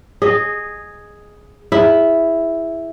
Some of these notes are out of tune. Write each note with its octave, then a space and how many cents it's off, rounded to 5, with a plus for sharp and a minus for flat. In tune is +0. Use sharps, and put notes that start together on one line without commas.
G#4 +0 D#5 -15
E4 +0 G#4 -15